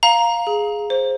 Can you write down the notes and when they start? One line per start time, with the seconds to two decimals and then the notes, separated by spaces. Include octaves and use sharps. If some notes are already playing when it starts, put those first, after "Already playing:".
0.03 F5 A#5
0.47 G#4
0.90 C5